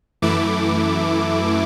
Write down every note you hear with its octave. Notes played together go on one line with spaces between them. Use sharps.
F#2 E3 A3 E4 D6